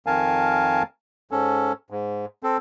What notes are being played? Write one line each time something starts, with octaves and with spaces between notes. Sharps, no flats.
F2 D#3 A#4 F5 G#5 A5
G#2 C#4 A4
G#2
C4 A4